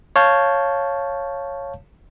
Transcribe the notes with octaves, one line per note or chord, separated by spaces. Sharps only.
C#5 F5 A5 G6